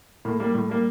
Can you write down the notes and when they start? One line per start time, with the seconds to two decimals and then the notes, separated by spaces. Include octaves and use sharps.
0.25 A2 A#3
0.40 G3 A#3
0.55 A2
0.70 G3 A#3